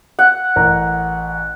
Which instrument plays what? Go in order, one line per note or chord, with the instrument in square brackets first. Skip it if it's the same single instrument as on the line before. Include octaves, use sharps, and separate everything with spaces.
[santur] F#5
[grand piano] A1 A#4 A#5